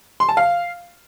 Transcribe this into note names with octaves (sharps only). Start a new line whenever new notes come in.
C6
A5
F5